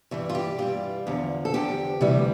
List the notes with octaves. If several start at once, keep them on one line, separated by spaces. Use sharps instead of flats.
G2 E3 G3
F4
G4
G2 E3 G3 F4
E2 D3 F3
A4
E2 D3 F3 G4
D2 C3 E3 G3